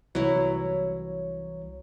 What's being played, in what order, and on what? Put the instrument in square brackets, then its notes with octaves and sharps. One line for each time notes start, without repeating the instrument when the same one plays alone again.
[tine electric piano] C2 E3 C#5 [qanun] F#3 E4